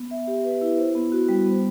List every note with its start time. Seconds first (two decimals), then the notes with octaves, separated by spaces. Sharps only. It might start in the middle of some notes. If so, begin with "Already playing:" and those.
Already playing: B3
0.11 E5
0.27 G4
0.44 B4
0.61 E4
0.78 C5
0.95 B3
1.12 F#4
1.29 G3
1.46 B3